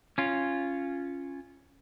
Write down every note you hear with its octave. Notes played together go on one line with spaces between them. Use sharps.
C#4 F4